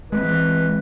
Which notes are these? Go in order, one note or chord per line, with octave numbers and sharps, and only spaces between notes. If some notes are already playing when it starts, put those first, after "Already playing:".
E3 G#3 A3 C4 B4